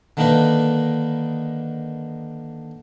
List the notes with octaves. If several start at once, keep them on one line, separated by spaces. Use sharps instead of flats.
D3 D#3 A#3 D4 D#4 B4